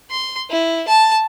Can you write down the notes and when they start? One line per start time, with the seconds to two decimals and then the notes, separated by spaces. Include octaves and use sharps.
0.10 C6
0.50 E4
0.88 A5